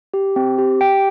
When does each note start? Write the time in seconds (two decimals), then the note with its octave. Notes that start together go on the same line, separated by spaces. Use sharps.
0.14 G4
0.36 C4
0.58 G4
0.81 G5